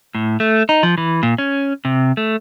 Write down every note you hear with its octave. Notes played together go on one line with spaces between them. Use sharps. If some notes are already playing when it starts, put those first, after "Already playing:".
A2
A3
D#4
F3
E3
A#2
C#4
C3
A3